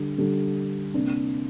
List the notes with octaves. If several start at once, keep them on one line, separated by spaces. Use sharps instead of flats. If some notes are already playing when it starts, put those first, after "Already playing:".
Already playing: D3 G3 D4
D3 G3 D4
C3 A#3 D4